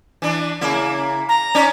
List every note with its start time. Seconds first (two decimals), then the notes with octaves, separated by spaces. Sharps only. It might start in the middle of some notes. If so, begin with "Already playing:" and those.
0.22 E3 D4
0.61 C#3 A#3 E4
1.29 A#5
1.55 C#4 D#4 D5